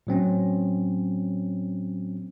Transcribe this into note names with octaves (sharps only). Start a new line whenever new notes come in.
A2 F#3 C4 C#4